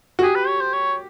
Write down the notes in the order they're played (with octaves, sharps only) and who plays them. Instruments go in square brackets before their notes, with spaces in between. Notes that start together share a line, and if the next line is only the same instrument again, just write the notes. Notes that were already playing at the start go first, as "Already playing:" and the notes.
[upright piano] F#4
[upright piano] G4 [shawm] G#4
[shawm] B4
C#5
C5
C#5